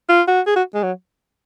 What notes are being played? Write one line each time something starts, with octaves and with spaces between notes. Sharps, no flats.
F4
F#4
G#4
F#4
G#3
F#3